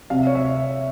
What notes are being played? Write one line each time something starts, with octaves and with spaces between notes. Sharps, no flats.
C3 F5
E5
C#5
E5